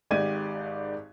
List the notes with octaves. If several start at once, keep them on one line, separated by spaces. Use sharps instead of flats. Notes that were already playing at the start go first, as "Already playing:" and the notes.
G#1 G#2 G4 D5 G#6 D#7